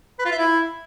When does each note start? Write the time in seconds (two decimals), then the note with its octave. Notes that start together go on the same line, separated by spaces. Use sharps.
0.19 B4
0.25 F4
0.32 E5
0.38 E4